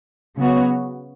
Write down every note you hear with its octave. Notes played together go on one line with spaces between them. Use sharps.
C#3 F#3 B3 F#4 C#5